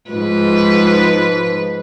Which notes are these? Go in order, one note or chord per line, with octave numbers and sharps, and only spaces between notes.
G#2 F3 B4